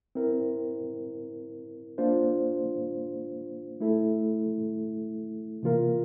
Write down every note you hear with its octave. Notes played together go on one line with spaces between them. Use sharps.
C4 E4 A#4
A#3 D4 F4 C5
A3 E4 A4
C3 E3 A#3 F4 A#4